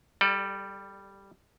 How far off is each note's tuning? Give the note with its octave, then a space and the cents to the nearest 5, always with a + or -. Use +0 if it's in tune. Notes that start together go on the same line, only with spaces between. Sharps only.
G3 +0 A4 -10 D5 +30